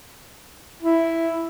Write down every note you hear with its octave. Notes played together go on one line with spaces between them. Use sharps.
E4